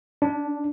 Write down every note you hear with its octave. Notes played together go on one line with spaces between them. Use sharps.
D4